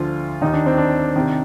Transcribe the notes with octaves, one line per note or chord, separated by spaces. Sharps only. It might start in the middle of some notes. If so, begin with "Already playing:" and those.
Already playing: D2 D3 F3 F4
D#2 D#3 D#4
D4
C4
D4
C3 D#3